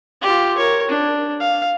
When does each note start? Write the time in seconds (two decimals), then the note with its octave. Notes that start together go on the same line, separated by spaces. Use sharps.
0.22 F4 G4
0.57 A#4 C#5
0.89 D4
1.40 F5